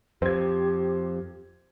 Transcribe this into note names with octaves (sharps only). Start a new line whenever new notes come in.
F2 G4 C5 G#6